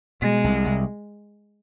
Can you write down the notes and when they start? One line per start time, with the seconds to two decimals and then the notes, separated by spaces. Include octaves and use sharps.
0.22 B2 G#3
0.44 C2
0.66 C2